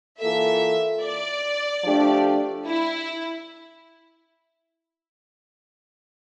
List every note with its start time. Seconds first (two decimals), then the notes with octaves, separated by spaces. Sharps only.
0.21 E3 A#3 F4 A4 E5
1.02 D5
1.83 F3 A3 D4 G4
2.66 E4